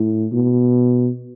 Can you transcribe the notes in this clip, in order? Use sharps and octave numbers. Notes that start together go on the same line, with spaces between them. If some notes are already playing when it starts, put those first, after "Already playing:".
Already playing: A2
B2